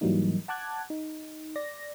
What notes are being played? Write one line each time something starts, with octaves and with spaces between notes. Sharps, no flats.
G#2 E3 F#3 G3 A#3 D#4
F#5 A5 D6 F#6 G#6
D#4
D5 A#6